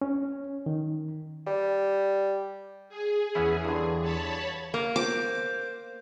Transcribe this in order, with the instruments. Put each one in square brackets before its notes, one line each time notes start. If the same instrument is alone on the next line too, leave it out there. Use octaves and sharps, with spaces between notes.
[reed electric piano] C#4
D#3
[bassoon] G3
[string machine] G#4
[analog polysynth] E2 E3 [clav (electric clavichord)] B3 C#4 E4
[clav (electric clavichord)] G2 D3
[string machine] C#5 A5 B5
[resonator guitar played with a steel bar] A#3
[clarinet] C5 [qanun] D6